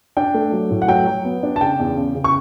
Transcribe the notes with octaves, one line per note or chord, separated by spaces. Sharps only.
D4 G5
A3
F#3
A2
F#5
F#3 G5
F#3
B3
D4
A5
C#3 G5
E2
C#3
C#3
C#6